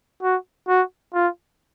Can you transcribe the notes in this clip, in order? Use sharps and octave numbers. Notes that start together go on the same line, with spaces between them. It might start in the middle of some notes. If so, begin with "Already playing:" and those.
F#4
F#4
F4